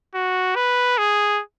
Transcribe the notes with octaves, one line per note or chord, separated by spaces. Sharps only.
F#4
B4
G#4